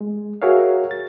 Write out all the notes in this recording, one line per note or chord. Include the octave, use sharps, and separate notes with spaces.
G#3
F#4 G#4 A#4 C#5 E5 F5
A6